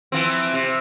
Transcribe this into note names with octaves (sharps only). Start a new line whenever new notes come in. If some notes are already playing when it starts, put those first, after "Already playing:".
E3 F3 C4
C3